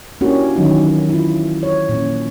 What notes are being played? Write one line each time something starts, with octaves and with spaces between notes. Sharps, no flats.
A#3 C#4 D4 E4 F#4 G4
D#3 E3 F#3 C#4 D#4
E4 F4
C#5
A#2 C#4